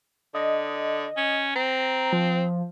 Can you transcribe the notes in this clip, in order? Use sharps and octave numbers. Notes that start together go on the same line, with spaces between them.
D3 D#5
C#4
C4 A#5
F3